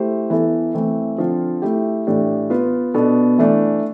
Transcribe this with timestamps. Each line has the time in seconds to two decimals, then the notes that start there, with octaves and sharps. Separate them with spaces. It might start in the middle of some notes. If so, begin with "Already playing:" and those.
Already playing: A3 E4 G4 C5
0.30 E3 B3 E4 A4
0.75 E3 A3 C4
1.18 D3 F3 C4 F4
1.62 A3 E4 G4
2.07 A2 E3 A3 D4 G4
2.50 B3 F4 B4
2.94 B2 B3 D4 A4
3.38 E3 A3 D4